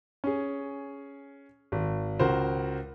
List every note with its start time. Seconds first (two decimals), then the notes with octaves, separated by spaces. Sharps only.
0.24 C#4 G#4
1.72 G#1
2.20 C#2 F#4 A#4 C5